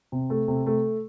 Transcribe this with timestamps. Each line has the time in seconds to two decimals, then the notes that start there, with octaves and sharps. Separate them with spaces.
0.12 C3
0.30 A3
0.48 C3
0.66 A3